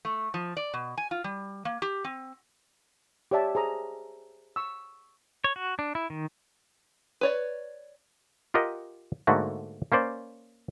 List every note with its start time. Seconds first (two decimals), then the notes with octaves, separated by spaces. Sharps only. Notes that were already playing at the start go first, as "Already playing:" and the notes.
0.05 A3
0.34 F3
0.57 D5
0.74 B2
0.97 G#5
1.11 F4
1.24 G3
1.65 A#3
1.82 G4
2.04 C4
3.31 G4 C#5 D5 E5 A5
3.55 G#4 C5 A#5 D#6
4.56 C#6 E6
5.44 C#5
5.56 F#4
5.79 D4
5.95 E4
6.10 D#3
7.21 B4 C#5 D5
8.54 F4 G4 A#4 D#5 F#5
9.27 G#2 D3 A3 A#3 F#4
9.92 A#3 C#4 C5 D5